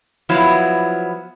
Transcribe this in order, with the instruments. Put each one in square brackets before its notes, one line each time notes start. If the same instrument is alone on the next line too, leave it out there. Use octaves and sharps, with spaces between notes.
[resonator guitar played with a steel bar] F3 F#3 B3 E4